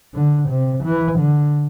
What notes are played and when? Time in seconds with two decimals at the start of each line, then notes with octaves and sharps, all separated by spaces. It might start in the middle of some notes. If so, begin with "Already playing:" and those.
0.14 D3
0.49 C3
0.84 E3
1.19 D3